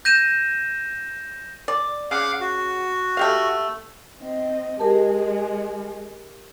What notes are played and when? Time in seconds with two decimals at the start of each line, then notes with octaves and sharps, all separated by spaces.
0.05 G6 A#6 D#7 E7
1.68 D5
2.11 C#3 F5 F#5 D6
2.40 F#4
3.17 A3 G4 F5
4.20 C4 D#5
4.80 G#3 G4 G#4 A#4 A5